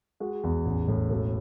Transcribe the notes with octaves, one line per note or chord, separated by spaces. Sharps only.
G#3 F#4
E2
A1 G#4
A2
E1 A4